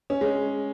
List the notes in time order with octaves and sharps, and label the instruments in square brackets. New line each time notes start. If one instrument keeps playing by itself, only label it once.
[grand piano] C#4
G#3